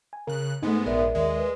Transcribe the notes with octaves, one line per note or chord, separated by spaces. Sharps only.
G#5
C#3 A#4 F#6
G#2 G#3 A3 B3 D#4
A#1 A#4 D5 E5
D#2 G#3
B4